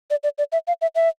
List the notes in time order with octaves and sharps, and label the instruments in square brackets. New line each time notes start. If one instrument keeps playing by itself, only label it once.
[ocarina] D5
D5
D5
E5
F5
E5
E5